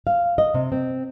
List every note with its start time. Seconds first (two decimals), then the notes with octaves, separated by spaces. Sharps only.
0.07 F5
0.38 D#5
0.54 C3
0.72 C4